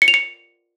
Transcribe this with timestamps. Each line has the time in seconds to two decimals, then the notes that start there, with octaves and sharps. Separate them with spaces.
0.02 C#7
0.08 F7
0.14 C#7